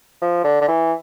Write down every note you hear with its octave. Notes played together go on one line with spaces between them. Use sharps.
F3
D3
D3
E3